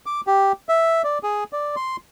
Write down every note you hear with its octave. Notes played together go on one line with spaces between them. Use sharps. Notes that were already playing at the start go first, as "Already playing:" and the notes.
D6
G4
E5
D5
G#4
D5
C6